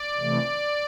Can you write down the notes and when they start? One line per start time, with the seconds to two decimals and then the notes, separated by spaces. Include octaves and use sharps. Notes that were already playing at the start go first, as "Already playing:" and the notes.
Already playing: D5
0.17 C3 E3 A3